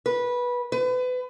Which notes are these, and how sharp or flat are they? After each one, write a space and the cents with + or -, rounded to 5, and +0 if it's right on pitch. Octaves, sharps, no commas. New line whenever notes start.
B4 -15
B4 +30